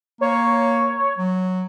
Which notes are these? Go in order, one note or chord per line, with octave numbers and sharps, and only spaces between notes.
A#3 C#5
F#3